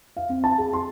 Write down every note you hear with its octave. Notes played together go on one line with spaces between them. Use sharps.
F5
C4
A5
G#4
C6